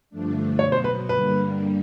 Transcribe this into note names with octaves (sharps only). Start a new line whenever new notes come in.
G2 D3 F3 A3 D4
B2 F#3 B3 C#5
C5
B4
G2 D3 G3 A#3 B4